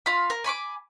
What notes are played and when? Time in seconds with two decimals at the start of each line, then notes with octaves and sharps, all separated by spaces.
0.06 F4 F5 B5
0.30 A#4
0.44 G#5 B5 C#6 D6